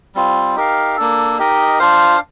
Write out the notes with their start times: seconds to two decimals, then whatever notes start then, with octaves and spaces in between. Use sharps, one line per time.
0.15 G3 C4 F4
0.56 D#4 G4 A#4 F5
0.97 A#3 D4 A4
1.38 D#4 G4 A#4 D#5
1.79 D4 F4 C5 F5